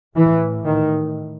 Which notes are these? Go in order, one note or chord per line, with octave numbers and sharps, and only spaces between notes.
A2 E3
D#3